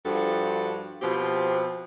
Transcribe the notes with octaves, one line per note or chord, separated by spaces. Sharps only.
G2 F3 F#4 A4
B2 F3 C4 G4